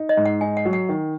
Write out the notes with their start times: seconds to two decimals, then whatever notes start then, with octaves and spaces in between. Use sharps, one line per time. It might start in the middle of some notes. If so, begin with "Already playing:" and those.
Already playing: D#4
0.09 D#5
0.17 G#2
0.26 F#5
0.41 D#4 G#5
0.57 F#5
0.65 F#3
0.73 F#5
0.89 D#3